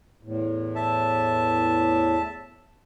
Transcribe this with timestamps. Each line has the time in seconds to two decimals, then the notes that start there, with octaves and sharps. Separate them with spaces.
0.23 E2 A2
0.75 E5 A5